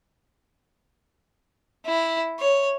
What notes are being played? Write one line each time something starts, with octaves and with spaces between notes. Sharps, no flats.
E4
C#5